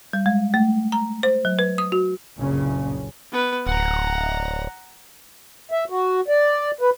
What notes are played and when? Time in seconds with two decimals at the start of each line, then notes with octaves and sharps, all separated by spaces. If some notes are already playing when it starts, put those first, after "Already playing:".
0.13 G3
0.26 G#3
0.54 A3
0.92 A#5
1.23 C5
1.45 F#3
1.59 B4
1.78 D#6
1.92 F#4
2.38 F#1 C2 G2 A#2 C#3 C#4
3.32 B3 B4
3.67 D1 F#5 A#5
5.72 E5
5.90 F#4
6.28 D5
6.81 B4